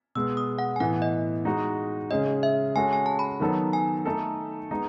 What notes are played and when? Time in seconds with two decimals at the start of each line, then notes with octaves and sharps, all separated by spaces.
0.15 B2 G#3 B3 E6
0.37 D#6
0.59 F#5
0.76 G#5
0.80 A2 E3 B3 F#5
1.02 D#5
1.45 G#3 D#4 F#4
2.11 C#3 G#3 C#4 G#4 D#5
2.43 E5
2.76 G#3 C#4 F#4 A4 G#5
2.93 G#5
3.06 A5
3.19 B5
3.40 D#3 F#3 B3 D#4 A4
3.73 G#5
4.06 A3 D#4 A4
4.71 G#3 B3 D#4